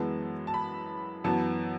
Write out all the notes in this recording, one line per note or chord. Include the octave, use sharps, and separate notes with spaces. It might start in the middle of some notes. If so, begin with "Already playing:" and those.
Already playing: F#2 E3 G#3 B3 A5
A5
B5
F#2 E3 B3 A5